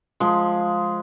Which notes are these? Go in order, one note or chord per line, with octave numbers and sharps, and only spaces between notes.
F3 G#3